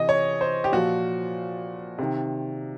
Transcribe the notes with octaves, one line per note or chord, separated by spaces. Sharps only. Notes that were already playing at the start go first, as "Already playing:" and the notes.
Already playing: C3 E3 D#5
C#5
C5
G4
A#2 F3 F#4
C3 D#3